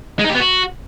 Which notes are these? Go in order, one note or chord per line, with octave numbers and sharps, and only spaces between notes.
G#3
D#4
G4
B3
F#4